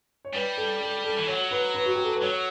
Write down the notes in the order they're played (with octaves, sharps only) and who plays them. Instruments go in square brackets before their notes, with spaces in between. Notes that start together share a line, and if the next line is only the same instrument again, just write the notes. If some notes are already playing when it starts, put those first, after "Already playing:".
[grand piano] C#5
[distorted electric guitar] G3 [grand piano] B4
[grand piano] A4
A4
A4
[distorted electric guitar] E3
[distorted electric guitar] F#3 [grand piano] C#5
[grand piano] B4
B4
F#4
G4
A4
B4
[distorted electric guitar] F#3 [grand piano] C#5